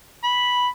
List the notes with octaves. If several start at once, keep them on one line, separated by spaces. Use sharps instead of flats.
B5